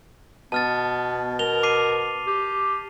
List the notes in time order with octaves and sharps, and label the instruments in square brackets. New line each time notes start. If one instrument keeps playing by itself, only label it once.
[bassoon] B2 [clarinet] B3 [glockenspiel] A5 F6 A6
[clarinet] A#4 [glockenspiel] F7 G7
[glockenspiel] D6 C7 D#7
[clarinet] G4